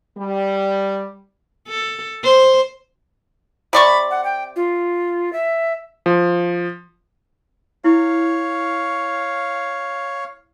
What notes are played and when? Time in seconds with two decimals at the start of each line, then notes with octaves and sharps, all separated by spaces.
0.18 G3
1.68 A4
2.24 C5
3.73 C3 D5 B5 C#6
4.10 F#5
4.24 G5
4.56 F4
5.33 E5
6.06 F3
7.84 E4 C#5 F5